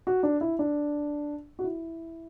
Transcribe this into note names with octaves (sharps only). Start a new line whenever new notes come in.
F#4
D4
E4
D4
F#4
E4